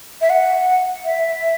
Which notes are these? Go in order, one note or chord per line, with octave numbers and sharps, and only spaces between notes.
E5
F#5
E5